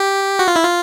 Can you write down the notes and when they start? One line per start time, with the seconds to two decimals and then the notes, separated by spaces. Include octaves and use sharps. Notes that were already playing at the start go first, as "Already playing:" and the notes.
Already playing: G4
0.39 F#4
0.48 F4
0.56 E4
0.63 F4